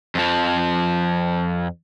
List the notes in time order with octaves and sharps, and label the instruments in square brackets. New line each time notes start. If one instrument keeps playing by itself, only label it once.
[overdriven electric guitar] F2 F3